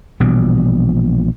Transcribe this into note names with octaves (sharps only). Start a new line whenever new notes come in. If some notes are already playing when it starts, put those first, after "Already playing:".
A#1 B2 E3 G3